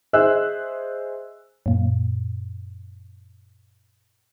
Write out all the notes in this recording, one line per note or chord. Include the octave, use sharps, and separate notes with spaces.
G#4 C5 D#5 E5 E6 F#6
F#2 A#2